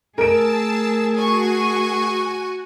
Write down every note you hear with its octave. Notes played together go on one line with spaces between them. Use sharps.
A3 G#4 A#4 A5 E6 D7
F#4 G#5 C#6